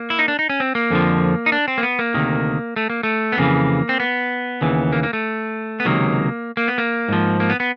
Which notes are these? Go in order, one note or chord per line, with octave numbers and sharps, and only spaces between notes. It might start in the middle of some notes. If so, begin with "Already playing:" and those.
Already playing: A#3
E4
D#4
D4
D#4
C#4
C4
A#3
F2 D3 F3
D#4
D4
C4
A#3
B3
A#3
D2 C3 D#3
A3
A#3
A3
B3
F2 C#3 E3 A#3
C4
B3
D#2 C#3 E3
A#3
A#3
A3
B3
C#2 C3 D#3 F#3 A#3
A#3
B3
A#3
G#2 F3
A#3
B3
B3